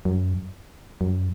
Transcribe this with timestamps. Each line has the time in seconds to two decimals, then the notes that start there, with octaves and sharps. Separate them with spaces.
0.05 F#2
1.01 F#2